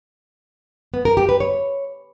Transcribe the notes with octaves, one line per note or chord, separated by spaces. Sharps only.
B3
A#4
G4
B4
C#5